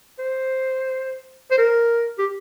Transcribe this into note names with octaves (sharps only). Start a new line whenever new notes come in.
C5
C5
A#4
G4